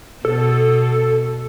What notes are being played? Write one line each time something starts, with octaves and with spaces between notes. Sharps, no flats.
B2 A4